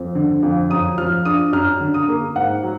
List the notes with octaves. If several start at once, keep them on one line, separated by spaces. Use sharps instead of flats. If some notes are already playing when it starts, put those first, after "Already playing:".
Already playing: F2
D3
F2
F#2 D#6
F3 F6
D4 D#6
F#2 F6
D3
D#6
A#3
G#2 F#5
F#3